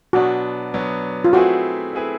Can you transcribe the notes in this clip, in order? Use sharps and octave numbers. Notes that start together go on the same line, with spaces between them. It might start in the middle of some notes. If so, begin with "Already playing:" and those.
B2 F#3 B3 D4 F#4
B2 F#3 B3 D4
F4
A3 C4 E4 F#4 G#4 B4
A3 C4 E4 G#4 B4